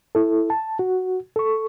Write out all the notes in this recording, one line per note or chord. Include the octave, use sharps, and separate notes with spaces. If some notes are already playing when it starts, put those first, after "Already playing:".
E4 A4
A5
F#4
A4 C#6